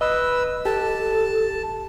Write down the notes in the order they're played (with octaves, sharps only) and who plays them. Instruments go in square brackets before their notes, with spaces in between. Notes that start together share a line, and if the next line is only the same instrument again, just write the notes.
[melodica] B4 E6 [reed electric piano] D#5
[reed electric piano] G4 [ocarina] A4 [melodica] A5